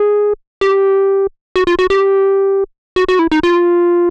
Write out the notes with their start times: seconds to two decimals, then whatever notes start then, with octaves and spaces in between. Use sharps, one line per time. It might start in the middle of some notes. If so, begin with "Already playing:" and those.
Already playing: G#4
0.61 G4
1.56 F#4
1.67 F4
1.79 F#4
1.90 G4
2.96 F#4
3.08 F#4
3.19 E4
3.32 D#4
3.43 F4